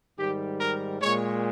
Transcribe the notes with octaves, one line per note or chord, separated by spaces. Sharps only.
G#2 D#3 G3 G4
A#4
A#2 G#3 C#5